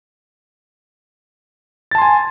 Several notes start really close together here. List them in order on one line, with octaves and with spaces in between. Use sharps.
A6 A5 C6 G#5